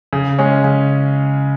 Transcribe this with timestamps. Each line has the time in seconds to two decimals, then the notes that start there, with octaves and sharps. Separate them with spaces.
0.13 C#3
0.39 G#3 C#4
0.64 C#3